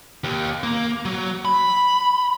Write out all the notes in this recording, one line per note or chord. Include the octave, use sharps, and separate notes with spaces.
D#2
A#3
F#3
B5